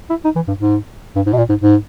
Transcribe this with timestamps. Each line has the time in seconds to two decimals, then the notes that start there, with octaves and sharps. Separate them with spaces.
0.10 E4
0.24 D#4
0.36 E3
0.48 G2
0.59 G#2
1.16 G2
1.26 G#2
1.33 B2
1.37 A#2
1.49 G#2
1.61 G#2